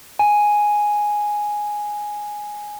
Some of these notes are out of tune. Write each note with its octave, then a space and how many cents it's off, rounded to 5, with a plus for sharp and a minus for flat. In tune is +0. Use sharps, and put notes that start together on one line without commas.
G#5 +0